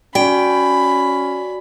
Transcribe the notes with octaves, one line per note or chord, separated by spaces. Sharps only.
C#4 F#4 D5 G5 B5